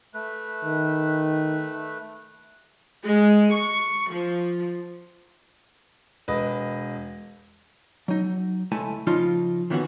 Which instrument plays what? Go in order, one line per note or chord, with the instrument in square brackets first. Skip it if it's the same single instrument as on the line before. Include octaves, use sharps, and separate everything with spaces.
[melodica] A3 B4
[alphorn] D#3
[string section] G#3
C#6
F3
[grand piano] E1 B4 D#5
[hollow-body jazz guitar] F#3 D#4
C#2 A3 E4 G#5 A5
C#3 F3 D#4 F4
D#3 E3 B3 C#4 F#4